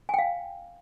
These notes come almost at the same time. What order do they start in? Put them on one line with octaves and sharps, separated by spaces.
G#5 G5 F5